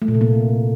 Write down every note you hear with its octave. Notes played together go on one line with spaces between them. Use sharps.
A3
A#2
C3
A#3